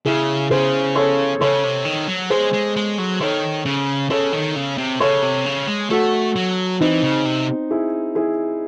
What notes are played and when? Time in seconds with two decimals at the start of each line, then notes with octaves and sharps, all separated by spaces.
0.05 C#3 E4 G#4
0.50 C#3 G#4 C5
0.96 A4 C#5
1.40 C#3 A4 C#5
1.64 C3
1.85 D#3
2.08 F#3
2.30 G#3 G#4 C5
2.53 G#3
2.76 G#3
2.98 F#3
3.20 D#3 A4 C#5
3.65 C#3
4.10 C#3 A4 C#5
4.33 D#3
4.56 C#3
4.78 C3
5.00 C#3 A4 C#5
5.23 C3
5.46 C#3
5.68 G#3
5.90 A3 F#4 A4
6.35 F#3
6.80 E3 C4 D#4
7.03 C#3
7.25 C3
7.71 E4 G#4
8.15 E4 G#4